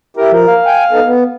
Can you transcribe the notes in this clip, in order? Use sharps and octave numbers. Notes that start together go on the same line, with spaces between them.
E4 G4 A#4
F3 A#4
F5
G5 G#5
B3 D#4 A4
B3